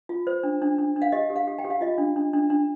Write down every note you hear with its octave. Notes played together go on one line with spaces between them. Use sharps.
F4
C5
D4
D4
D4
D4
F5
G4 D#5
G4
F5
G4
G5
G4
F5
F4 D#5
D4
D4
D4
D4